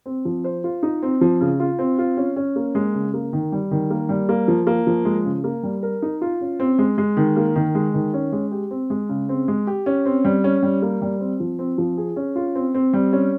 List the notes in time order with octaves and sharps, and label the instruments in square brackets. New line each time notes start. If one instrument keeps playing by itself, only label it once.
[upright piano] C4
F3
C5
F4
D#4
C4
F3
C#3
F4
C4
F4
C#4
C#4
A#3
G#3
C#3
A#3
D#3
G3
D#3
A#3
G3
A#3
F3
A#3
F3
G#3
C#3
A#3
G3
A#4
D#4
F4
C#4
C4
G#3
G#3
D#3
A#3
D#3
G#3
D#3
C#4
G#3
G4
C4
G#3
C#3
C4
G#3
G4
C#4
C4
G3
C#4
G3
A#3
G3
C4
F3
C4
F3
G#4
C#4
F4
C4
C4
G3
C#4